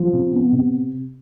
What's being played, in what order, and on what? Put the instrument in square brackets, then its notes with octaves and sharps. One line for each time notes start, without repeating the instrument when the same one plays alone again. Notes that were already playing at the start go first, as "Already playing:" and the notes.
Already playing: [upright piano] F3
C3
B3
C3